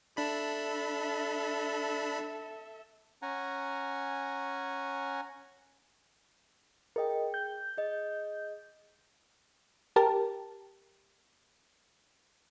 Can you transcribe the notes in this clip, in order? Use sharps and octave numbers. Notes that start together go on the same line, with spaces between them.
D4 A4 E5 B5
C#4 F#5 G#5 A#5
G#4 A#4 D#5 G5
G6
G#4 D#5
G4 A#4 A5